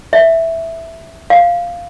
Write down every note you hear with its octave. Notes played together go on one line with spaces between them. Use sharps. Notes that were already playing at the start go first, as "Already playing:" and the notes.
E5
F5